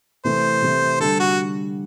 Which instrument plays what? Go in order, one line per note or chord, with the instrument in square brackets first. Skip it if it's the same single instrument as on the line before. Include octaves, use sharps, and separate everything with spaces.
[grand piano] C3 E3 A3 [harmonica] C5
[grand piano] C3 E3 A3
[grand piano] D3 G3 D4 [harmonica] A4
[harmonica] F#4